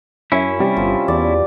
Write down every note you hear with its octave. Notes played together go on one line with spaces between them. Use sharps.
F#2 C#4 E4 E5
C3 G3
G1 F3
E2 D5